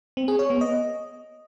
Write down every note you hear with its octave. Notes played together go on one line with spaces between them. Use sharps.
C4
G#4
C#5
B3
D#5